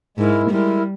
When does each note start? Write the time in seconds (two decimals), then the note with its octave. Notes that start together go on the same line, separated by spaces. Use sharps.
0.17 G#2 G#3 E4 A#4
0.50 G3 G#3 E4 A#4